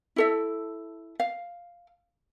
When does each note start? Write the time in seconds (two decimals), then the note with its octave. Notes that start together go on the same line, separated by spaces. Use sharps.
0.16 E4 A4 E5
1.20 F5